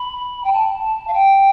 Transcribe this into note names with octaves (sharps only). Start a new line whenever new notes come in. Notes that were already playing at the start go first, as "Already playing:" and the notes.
Already playing: B5
G5
A5
F5
G5